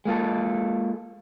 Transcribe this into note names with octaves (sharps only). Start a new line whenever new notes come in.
G#3 A#3 F4 A4